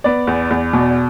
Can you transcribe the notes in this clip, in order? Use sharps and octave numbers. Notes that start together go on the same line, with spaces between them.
B3 D5
E2
E2
B2